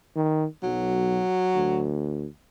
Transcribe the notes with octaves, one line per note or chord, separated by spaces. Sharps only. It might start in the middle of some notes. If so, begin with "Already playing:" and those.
D#3
B1 F#3
D2